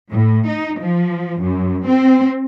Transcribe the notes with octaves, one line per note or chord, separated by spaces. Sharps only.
A2
D#4
F3
F#2
C4